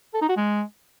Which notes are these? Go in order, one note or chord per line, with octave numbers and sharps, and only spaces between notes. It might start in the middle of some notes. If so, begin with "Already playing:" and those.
A4
D#4
F#4
G#3